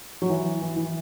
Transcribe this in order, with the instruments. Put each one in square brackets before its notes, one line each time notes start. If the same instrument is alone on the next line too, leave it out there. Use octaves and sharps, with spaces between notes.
[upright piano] F#3
E3
E3
E3